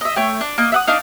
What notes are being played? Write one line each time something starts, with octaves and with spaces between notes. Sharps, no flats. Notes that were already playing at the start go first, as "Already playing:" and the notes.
D#5 E5
A3 C#5 G5
D4
A#3 D#5
E5 F#5 D#6
D4 D#4 F5